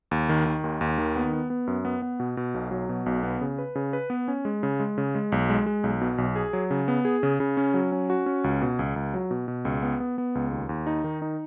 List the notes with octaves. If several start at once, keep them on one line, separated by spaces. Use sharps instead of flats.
D#2
D#3
D#3
D#2
D#2
D#3
B3
B3
B3
F#2
B3
B3
B2
B2
B1
F#3
B2
B1
B3
C#3
B4
C#3
B4
B3
C#4
G#3
C#3
G#3
C#3
G#3
B1
G#3
G#3
B1
B2
B1
G#4
F#3
C#3
B3
G#4
C#3
C#3
C#4
F#3
C#4
F#4
C#4
C#2
B2
C#2
C#2
F#3
B2
B2
C#2
B3
B3
B3
C#2
D#2
D#2
D#4
D#3
D#4